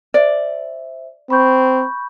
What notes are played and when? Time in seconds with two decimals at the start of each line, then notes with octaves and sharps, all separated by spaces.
0.14 C5 D5 E5
1.30 C4 B5 C#6 G6